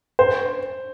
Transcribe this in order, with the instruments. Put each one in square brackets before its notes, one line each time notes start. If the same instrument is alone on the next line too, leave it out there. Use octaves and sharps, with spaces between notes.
[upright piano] C5